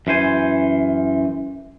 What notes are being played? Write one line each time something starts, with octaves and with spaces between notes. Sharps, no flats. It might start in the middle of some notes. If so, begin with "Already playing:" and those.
F#2 E3 C5 G#5